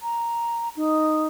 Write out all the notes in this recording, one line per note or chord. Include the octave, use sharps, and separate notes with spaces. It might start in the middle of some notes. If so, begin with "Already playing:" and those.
A#5
D#4